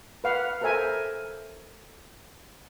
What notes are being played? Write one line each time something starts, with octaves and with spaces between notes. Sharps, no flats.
B4 F5 F#5
A4 A#4 C5 E5 G#5